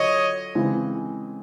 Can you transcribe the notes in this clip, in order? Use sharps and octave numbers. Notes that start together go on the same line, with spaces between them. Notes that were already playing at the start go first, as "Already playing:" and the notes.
Already playing: D3 F#3 F4 C#5 D#5
C#3 E3 G#3 C4